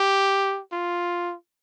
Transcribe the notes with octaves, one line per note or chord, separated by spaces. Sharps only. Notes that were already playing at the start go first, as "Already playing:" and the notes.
Already playing: G4
F4